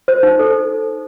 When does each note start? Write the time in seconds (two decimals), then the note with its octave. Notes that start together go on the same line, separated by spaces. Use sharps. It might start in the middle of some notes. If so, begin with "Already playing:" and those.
0.08 C5
0.23 D#4
0.39 A4